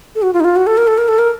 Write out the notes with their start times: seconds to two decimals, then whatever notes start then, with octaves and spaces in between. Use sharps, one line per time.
0.15 A4
0.22 F#4
0.33 F4
0.40 D#4
0.44 F4
0.56 F#4
0.67 A4
0.78 A#4
0.87 A4
0.98 A#4
1.08 A4
1.19 A#4